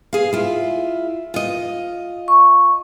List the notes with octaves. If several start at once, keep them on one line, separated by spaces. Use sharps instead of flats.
G#4 F5
E4 F4
F4 D#5
C#6